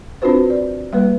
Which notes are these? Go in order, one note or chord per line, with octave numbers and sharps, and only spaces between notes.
C4 D4 F4 F#4 B4 C5
D5
G3 A#3 B4